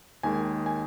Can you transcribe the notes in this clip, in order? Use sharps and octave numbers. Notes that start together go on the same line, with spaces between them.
D#2 D#3 G#3 G#5
G#5